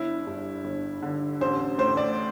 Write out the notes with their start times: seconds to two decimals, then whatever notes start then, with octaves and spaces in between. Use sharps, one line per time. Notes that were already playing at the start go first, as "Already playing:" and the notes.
Already playing: G1 E4
0.27 G2
0.64 G1
1.02 D3
1.41 A1 C5
1.78 A2 C5
1.97 D5